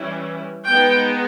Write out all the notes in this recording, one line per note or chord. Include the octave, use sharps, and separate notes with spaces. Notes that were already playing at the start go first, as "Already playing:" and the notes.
Already playing: E3 G3 C#4 E4
G#3 B3 D#4 G5